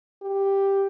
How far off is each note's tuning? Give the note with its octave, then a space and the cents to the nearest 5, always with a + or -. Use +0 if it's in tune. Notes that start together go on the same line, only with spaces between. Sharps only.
G4 +5